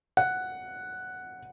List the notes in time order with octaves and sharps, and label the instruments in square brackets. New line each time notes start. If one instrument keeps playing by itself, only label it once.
[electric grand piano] F#5